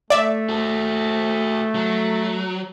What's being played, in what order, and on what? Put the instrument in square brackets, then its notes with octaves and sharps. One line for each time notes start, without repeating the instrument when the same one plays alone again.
[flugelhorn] A3 [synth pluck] D5 E5
[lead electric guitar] F#4 A4
F#3